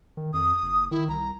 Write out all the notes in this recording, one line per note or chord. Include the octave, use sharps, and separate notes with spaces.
D#3
F2 D#6
F#1
D#3 E4
C2 A#5